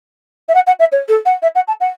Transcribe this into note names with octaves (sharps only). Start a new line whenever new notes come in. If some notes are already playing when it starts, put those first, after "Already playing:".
E5
F#5
F#5
E5
C#5
A4
F#5
E5
F#5
A5
F#5